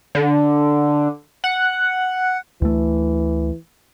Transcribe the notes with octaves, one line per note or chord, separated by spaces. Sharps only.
D3
F#5
D2 E3 A3